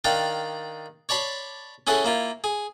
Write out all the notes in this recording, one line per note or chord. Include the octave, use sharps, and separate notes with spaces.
D#3 D4 D5 F5 G5
C#5 D5 A5 B5 C6
C#4 E4 G#4 A4 F#5
A#3 E4 F4
G#4